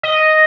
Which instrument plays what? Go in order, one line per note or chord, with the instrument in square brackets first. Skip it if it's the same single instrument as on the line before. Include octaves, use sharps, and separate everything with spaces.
[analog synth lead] D#5